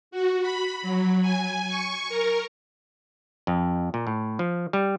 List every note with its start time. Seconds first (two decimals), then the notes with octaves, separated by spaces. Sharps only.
0.11 F#4
0.42 B5
0.82 F#3
1.22 G#5
1.68 C#6
2.09 A#4
3.47 F2
3.94 A#2
4.07 A2
4.39 F3
4.73 G3